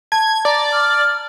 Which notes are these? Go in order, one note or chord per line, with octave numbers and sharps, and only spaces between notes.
A5 G#6
D5 A#5
F6